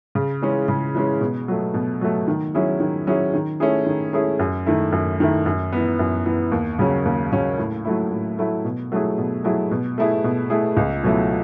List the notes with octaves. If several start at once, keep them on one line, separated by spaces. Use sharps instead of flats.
C#3
E3 G#3 C#4
C#3
E3 G#3 C#4
B2
F#3 A3
B2
F#3 A3
D#3
F#3 C#4 E4 G#4
D#3
F#3 C#4 E4 G#4
D#3
A3 C#4 E4 G#4
D#3
A3 C#4 E4 G#4
F#2
D#3 A3 E4
F#2
D#3 A3 E4
F#2
E3 B3
F#2
E3 B3
D#2
C#3 F#3 C#4
D#2
C#3 F#3 C#4
A2
F#3 A3 E4
A2
F#3 A3 E4
B2
F#3 A3 E4 G#4
B2
F#3 A3 E4 G#4
B2
A3 E4 G#4
B2
A3 E4 G#4
C#2
B2 F#3 A3 E4